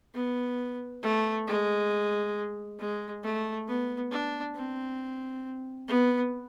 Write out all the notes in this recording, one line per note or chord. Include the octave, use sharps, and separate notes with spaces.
B3
A3
G#3
G#3
A3
B3
D4
C4
B3